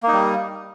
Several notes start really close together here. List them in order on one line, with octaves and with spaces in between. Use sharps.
A#3 D#4 G3